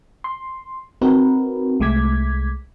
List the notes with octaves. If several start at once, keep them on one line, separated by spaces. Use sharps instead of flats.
C6
C4 D#4 F#4 A#4 B4
C2 G#3 A3 D6 G#6 B6